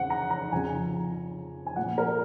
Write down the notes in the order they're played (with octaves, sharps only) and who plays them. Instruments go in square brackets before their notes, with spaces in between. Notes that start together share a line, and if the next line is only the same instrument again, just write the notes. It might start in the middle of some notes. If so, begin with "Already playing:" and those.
Already playing: [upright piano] F2 C#3 F#5
A#5
A#5
F2 C#3 F3 G#5
G#5
A#2 F3 F#5
A#4